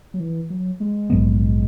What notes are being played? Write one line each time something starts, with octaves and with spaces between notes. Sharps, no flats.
F#3
E3
F#3
G#3
A#1 G#2 F#3 B3